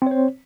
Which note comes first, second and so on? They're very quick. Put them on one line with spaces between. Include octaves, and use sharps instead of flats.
C4 C#5 C5